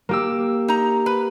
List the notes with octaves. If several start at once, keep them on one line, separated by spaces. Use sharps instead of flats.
A#3 G4 E6
D#4 A#5
B4